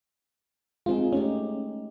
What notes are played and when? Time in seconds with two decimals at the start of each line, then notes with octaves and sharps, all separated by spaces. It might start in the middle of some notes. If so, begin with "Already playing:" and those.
0.86 G#3 C4 D#4 F4 G#4
1.13 A3 C#4 D#4 G4